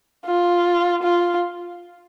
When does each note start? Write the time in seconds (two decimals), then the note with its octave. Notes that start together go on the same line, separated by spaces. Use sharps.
0.26 F4
1.03 F4